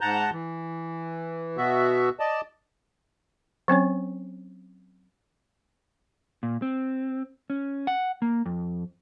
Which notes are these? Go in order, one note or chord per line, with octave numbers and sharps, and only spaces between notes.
G#2 F#5 A5 A#5 G6
E3
B2 B3 F#4 E5
D5 D#5 A5
F#3 C4 C#4 C#5
A#2
C4
C#4
F#5
A#3
F2